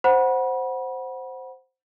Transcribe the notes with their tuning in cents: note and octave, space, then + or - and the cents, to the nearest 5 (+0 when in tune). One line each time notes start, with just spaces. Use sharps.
C5 +0 F#5 +0 B5 -35